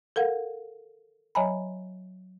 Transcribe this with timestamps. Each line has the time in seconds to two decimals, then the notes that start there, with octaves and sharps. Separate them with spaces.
0.16 A4 A#4 F5 F#5
1.35 F#3 C#5 D#5 G#5 A#5 B5